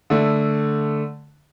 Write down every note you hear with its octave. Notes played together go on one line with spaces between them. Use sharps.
D3 A3